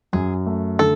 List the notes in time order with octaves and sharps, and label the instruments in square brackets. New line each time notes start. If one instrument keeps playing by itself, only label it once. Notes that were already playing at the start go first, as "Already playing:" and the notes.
[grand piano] F#2 [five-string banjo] G#4
[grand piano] A3
[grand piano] D3 [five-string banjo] A4